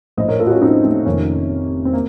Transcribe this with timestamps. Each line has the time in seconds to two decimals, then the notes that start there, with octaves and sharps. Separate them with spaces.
0.17 A#1 A2 C5 D#5
0.28 A#4 C#5
0.40 F4 A4
0.47 F#4
0.50 C#4 F4
0.61 C4 D#4
0.83 A3 C4
1.06 F1 F2 C3 D#3 A#3 C#4
1.85 C4
1.93 A#3